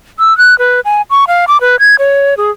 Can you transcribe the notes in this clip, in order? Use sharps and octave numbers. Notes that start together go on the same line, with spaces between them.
E6
F#6
B4
G#5
C#6
F5
D6
B4
G#6
C#5
G#4